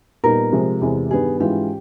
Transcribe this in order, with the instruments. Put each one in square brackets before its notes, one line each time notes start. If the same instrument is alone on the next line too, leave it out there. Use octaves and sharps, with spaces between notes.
[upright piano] A#2 G3 B3 D#4 [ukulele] A#4
[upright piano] C3 F3 G#3
E2 C3 E3 G#3
[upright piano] G2 D#3 G3 B3 [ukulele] G#4
[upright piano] G#2 E3 G#3 C#4 F4 [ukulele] G4